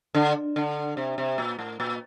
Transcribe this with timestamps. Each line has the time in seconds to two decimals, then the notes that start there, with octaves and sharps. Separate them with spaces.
0.15 D3
0.56 D3
0.97 C3
1.18 C3
1.38 A#2
1.59 A2
1.80 A#2